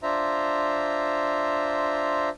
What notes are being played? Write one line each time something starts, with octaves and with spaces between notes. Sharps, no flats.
D4 F4 C5 E5 A#5